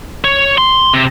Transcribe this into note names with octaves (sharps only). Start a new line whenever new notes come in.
C#5
C6
C3